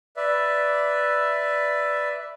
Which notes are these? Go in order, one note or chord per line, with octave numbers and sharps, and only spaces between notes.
B4 D5 E5